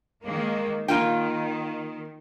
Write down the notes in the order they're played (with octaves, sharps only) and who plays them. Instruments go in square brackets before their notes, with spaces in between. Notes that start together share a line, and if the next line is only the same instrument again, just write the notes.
[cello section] D#3 G#3 A#3
[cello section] D#3 [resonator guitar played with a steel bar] A#3 F4 G5